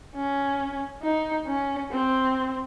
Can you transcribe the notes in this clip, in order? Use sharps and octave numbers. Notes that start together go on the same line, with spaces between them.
C#4
D#4
C#4
C4